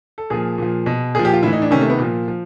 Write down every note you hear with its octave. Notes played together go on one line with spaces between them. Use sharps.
A4
A#2 F3 G#4
A#2 F3
B2
A#2 F3 G#4
G4
F4
A2 E3 E4
D#4
D4
C3 D#3 C#4
A3
B3
A#2 F3
F3